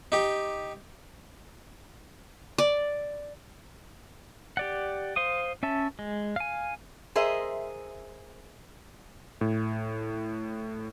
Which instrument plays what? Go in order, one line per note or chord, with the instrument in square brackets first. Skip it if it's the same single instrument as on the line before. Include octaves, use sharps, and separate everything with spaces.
[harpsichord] D#4 G4
[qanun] D5
[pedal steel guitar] G4 D5 F#5
C5 F5 D#6
C#4 E5 A5
G#3
F5 G#5
[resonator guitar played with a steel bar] G#4 A#4 C5 D#5 E5
[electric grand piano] A2